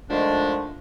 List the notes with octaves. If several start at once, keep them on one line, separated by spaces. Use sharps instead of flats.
D3 D#3 F3 G#3 A3 D4